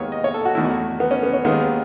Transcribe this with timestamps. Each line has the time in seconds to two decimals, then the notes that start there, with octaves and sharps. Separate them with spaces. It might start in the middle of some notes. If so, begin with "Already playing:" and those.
Already playing: D#2 D#3 G#3 B3 C#5
0.12 D#5
0.24 C#5
0.34 A4
0.45 F#4
0.55 E2 D#3 A3 E4
0.65 F#4
1.00 B3
1.11 C#4
1.23 B3
1.33 C#4
1.44 D#2 D#3 G#3 B3